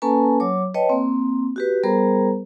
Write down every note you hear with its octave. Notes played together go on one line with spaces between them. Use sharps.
A#3 C#4 A4 B4 G#5 A5
F#3 C#5 D6
B4 C#5 D#5 G5 A5
A#3 C4
F#4 G4 B4
G3 B3 G#4 A#4 C5 A#5